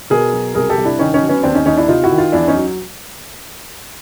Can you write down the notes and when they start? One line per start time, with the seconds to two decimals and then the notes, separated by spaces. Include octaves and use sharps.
0.10 B2 G#4 A#4
0.33 F#3
0.54 C2 G#4 A#4
0.70 G4 A4
0.77 C2
0.85 D4 E4
0.99 D#3 C#4 D#4
1.14 C#4 D#4
1.22 F#3
1.29 B3 C#4
1.43 D#2 C4 D4
1.55 C#4 D#4
1.66 D#2 C#4 D#4
1.77 D4 E4
1.88 C3 D#4 F4
2.03 E4 F#4
2.10 D#3
2.18 D#4 F4
2.32 E2 D4 E4
2.48 C#4 D#4
2.55 F#3